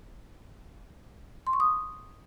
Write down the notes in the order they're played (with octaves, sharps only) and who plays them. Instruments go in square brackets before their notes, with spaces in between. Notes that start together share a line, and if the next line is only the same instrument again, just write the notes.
[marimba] C6
C#6
D#6